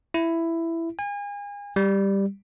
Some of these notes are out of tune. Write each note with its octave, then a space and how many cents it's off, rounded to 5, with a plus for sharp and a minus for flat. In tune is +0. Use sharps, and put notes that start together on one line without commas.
E4 +10
G#5 -35
G3 +5